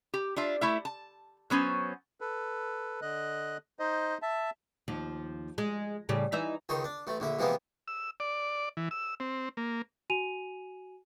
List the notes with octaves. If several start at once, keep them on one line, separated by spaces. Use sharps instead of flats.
G4
D4 F4 E5
A3 E4 E5
A5
F#3 B3 C#4 C5
A4 B4
D3 D#5 F#6
D#4 C5 D#5
E5 A5
D#2 F3
G#3
A2 C#3 G3
E3 D#4 E5
C#2 D#3 C5 C#5
D4
A1 A3
A#1 D3 E5
C3 E3 F3 G#3 A#3 B3
E6
D5
E3
E6
C4
A#3
F#4 G#5 D#7 F7